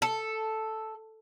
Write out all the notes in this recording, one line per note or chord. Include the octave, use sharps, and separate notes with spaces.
A4